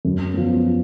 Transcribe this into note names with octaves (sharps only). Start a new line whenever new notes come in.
F#2
F3 B3